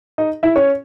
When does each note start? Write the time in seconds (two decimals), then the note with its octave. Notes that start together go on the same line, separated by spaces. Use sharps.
0.18 D#4 D#5
0.43 E4 E5
0.56 C#4 C#5